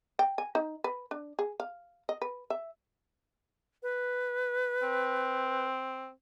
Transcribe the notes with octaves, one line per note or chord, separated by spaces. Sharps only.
G5
G#5
D#4
B4
D4
G#4
F5
D#5
B4
E5
B4
C4